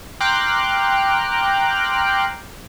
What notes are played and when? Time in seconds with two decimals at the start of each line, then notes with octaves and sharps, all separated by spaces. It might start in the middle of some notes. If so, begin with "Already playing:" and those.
0.20 G5 A#5 C6 D6 F6 F#6